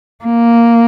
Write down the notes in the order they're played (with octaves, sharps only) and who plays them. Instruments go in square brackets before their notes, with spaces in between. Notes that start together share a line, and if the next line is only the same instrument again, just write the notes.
[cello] A#3